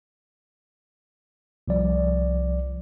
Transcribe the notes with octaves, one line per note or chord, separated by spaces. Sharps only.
C2 F3 D5